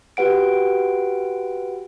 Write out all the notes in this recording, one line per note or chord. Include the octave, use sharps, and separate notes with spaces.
F#4 G4 B4 F#5 D7